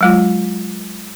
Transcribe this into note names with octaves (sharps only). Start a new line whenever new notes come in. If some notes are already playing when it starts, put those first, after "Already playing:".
F#3 G#3 F4